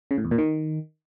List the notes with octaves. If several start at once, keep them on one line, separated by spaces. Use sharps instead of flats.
C#3
A2
E2
A#2
D#3